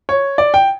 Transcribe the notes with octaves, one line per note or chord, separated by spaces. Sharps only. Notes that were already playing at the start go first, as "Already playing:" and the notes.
C#5
D5
G5